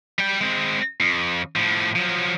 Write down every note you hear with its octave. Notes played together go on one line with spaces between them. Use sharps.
G3 G5
G#3 C4
F2
A2 F3
F3 F#3